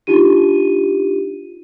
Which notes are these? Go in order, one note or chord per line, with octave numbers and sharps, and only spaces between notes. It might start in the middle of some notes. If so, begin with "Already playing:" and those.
D4 D#4 F4 G4 D#7